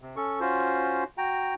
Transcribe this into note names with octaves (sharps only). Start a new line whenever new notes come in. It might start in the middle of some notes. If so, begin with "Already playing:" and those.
C3
C#4 A4 C#6
C#4 F4 F#4 C5
F#4 G5 A#5